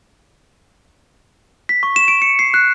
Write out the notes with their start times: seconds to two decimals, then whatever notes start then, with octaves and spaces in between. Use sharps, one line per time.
1.69 B6
1.83 C#6
1.96 E7
2.08 D7
2.22 C#7
2.39 C7
2.54 F#6